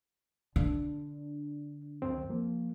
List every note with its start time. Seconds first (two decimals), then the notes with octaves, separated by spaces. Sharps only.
0.56 D3 D4
2.02 C#2 F#2 C4
2.29 F3 A#3